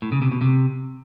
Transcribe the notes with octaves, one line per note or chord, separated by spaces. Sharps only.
A2
C#3
C3
B2
C3